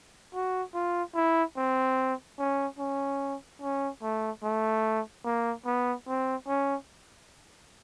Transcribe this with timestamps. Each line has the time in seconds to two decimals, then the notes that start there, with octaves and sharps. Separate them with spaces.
0.34 F#4
0.74 F4
1.15 E4
1.57 C4
2.38 C#4
2.79 C#4
3.61 C#4
4.03 A3
4.44 A3
5.25 A#3
5.66 B3
6.07 C4
6.47 C#4